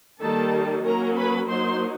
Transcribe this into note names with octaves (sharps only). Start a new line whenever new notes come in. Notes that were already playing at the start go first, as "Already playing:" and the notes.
D#3 G3 A#3 D#4 A4 A5
F#3 A#3 C#4 A#4 A#5
B4 B5
F#3 A#3 D#4 C5 C6